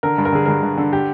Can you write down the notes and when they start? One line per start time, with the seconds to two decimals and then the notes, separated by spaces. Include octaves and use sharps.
0.03 D3 A#4
0.18 G2
0.25 A#4
0.33 D3 G#4
0.46 G2 A#4
0.63 G2
0.78 D3
0.93 G4